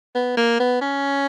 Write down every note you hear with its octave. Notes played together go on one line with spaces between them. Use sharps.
B3
A#3
B3
C#4